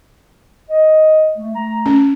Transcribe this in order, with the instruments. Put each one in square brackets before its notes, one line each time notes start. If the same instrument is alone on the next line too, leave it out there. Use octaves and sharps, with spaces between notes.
[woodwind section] D#5
A3
A3 A#5
[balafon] C#4